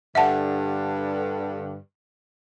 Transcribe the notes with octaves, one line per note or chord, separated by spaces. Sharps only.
G2 D3 E5 F#5 A5